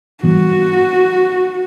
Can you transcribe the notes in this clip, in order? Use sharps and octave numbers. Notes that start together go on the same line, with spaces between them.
G#2 E3 G3 B3 F#4